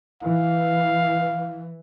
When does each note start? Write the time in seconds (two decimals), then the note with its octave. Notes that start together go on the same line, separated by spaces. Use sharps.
0.22 E3 F5